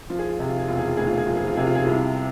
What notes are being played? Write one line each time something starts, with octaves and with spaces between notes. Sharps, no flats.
F3 F4
G#4
F4
C3 G#4
F4
G#4
E1 F4
G#4
F4
D2 G#4
F4
G#4
F3 F4
G#4
F4
C3 G#4
F4
G#4
C2 F4